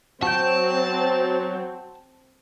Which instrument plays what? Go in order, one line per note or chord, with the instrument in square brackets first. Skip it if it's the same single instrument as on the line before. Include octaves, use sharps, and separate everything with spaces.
[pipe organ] F#3 [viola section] C4 [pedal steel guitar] F#4 G5 [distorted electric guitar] A5